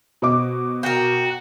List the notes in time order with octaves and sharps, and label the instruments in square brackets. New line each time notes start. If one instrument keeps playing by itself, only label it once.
[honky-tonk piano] B2 [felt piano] C5 D#5 D6
[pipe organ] F#4 [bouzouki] A#4 G5